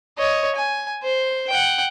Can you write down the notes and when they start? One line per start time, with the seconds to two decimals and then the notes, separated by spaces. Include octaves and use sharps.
0.18 C#5 D#5
0.56 G#5
1.03 C5
1.48 F#5 G5